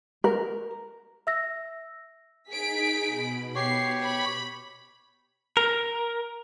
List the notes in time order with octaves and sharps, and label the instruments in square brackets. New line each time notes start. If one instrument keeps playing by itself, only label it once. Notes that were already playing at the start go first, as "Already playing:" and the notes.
[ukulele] A#4
[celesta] E5 E6 A#6
[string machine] D#4 [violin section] G#4 B6 D7
[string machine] B2 B5
[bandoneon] G4 C#5 C#6 [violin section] C7
[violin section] B5
[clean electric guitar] A#4